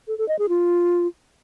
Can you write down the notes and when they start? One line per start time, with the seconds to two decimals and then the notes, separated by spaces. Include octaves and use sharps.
0.08 A4
0.18 A4
0.28 D#5
0.39 G#4
0.49 F4